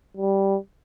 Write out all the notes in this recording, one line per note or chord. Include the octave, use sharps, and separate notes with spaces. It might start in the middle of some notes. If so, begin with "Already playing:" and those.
G3